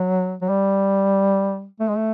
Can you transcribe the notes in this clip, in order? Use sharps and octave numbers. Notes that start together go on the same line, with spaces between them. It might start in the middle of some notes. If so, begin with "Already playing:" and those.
Already playing: F#3
F#3
G3
A3
G#3
A3